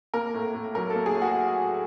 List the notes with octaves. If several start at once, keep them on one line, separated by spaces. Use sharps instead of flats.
A#3 A#4
A2
A2
F#3 A#4
A4
A#3
G#4
A2
F#4